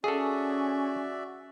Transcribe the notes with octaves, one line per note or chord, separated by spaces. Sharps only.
C#4 F#4 G#4 A4 D5 E5